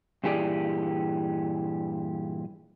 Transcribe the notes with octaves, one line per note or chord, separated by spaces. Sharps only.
G2 A#2 E3 G4 G#4 D5